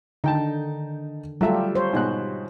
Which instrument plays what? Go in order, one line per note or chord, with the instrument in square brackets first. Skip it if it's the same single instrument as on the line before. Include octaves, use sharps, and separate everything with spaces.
[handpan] D3 D#3 [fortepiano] D#4 G5 A5
[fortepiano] F#3 A3 E5 [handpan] G3 F4 G4
[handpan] C5 C#5
[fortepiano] G#2 B2 F#6